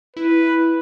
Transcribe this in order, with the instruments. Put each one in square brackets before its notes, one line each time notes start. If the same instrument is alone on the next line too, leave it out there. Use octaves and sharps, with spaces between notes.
[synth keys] E4 [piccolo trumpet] B4